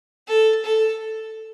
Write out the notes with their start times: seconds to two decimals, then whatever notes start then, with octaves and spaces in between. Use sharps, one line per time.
0.28 A4
0.65 A4